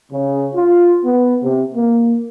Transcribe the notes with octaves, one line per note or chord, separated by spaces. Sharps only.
C#3
F4
B3
C3
A#3